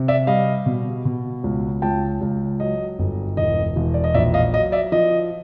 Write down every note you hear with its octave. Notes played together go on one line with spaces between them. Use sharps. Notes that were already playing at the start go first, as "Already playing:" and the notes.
Already playing: C3
D5 E5
G3 D#5 F5
B2
B2
C#2
C#2 G5 A5
C#2
F#3 D#5
G1
E1 D#5
E1
D5
D#5
A#1 D5 E5
D#5 F5
F#3 D#5
D5 E5
F3 D#5